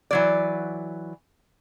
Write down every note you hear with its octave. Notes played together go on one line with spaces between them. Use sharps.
E3 F#3 D5